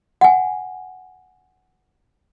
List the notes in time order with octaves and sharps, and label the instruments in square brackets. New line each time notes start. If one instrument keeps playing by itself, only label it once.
[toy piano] F#5 G#5